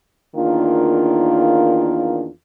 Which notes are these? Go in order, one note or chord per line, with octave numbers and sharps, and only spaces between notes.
E2 D#3 A#3 D4 F4